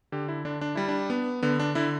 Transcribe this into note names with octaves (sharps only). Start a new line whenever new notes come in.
D3 G4
E4
D3 D4
D4
G3 E4
D4
B3
D3 B3
D4
D3 E4